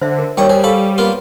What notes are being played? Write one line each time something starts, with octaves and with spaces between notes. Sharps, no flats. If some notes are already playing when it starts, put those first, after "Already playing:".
D3 C5 E5
A#4
D#2 G3 C#5 D5 G5 C#6 D#6
G#4 A#4 C5 C#5
A4 F5 B5 C#6
A#3 B3 F4